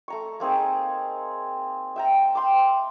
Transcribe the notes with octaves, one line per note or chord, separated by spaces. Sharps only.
A3 A#5 C#6
A#3 C4 D#4 G#4
E5 G5 A#5
G5 C6 D6